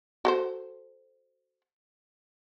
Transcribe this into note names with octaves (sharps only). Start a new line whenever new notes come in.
F#4 A4 C5